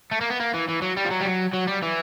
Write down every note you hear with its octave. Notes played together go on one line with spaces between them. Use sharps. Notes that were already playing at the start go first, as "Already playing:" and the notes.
A3
A#3
B3
A#3
E3
E3
F#3
G3
F3
F#3
G3
F#3
F#3
G3
E3